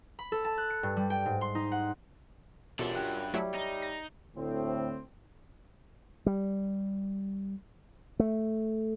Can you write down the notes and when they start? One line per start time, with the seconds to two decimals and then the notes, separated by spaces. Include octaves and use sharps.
0.19 B5
0.32 A4
0.45 A5
0.58 F#6
0.70 C#7
0.83 G2
0.97 G3
1.10 G5
1.26 G#2
1.41 C6
1.55 D#4
1.72 F#5
2.79 F#2 B2 E3 D4 F4 G4 A4
2.96 G2 G5 F#6
3.34 F#3 G3 A3 E4 C#5 E5
3.54 D#4
3.82 A#6
4.36 D2 A2 C4
6.26 G3
8.20 A3